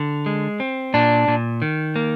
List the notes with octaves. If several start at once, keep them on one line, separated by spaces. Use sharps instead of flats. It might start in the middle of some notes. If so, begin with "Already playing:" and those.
Already playing: D3
G#3
C4
A#2 D4
A#2
D#3
A#3